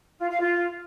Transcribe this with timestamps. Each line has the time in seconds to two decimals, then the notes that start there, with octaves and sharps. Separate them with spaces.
0.19 F4
0.29 F5
0.39 F4